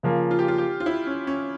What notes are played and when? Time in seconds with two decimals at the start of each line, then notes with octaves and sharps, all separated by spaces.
0.03 C#3 F3 A#3
0.31 F4
0.39 G4
0.48 F4
0.58 G4
0.80 F4
0.86 E4
1.07 C#4
1.27 C#4